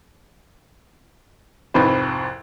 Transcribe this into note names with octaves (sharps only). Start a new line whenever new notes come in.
C2 F2 G#2 F3 B4 C5